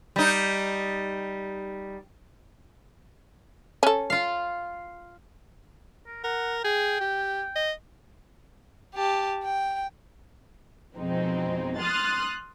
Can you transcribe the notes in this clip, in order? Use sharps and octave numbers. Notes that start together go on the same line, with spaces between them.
G3 D#4
C#4 A4
F4 F5
A#4
A#4 F#5
G#4 G5
G4
D#5
G4 A5
G5
F2 B2 G#3 C4 D#4
C6 D#6 F6 F#6 A6